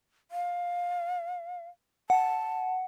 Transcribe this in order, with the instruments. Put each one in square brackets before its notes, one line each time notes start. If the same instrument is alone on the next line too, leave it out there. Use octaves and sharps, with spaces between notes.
[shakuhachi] F5
[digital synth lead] F#5 [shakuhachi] A5